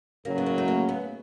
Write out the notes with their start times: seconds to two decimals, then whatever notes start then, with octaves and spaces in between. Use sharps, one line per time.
0.25 F#1 F#2 C#3 F#3 A#3
0.38 B3
0.46 A#3
0.58 A3
0.68 A#3
0.89 B3